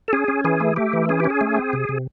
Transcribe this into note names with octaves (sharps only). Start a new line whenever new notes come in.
A4
C#4 G#4
C#4
E3 G#4
A3
A3 G4
E3
C#4 G#4
C#4 G4
G#4
A3
C4
C3
C3